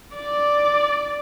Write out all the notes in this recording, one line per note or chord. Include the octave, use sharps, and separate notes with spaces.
D5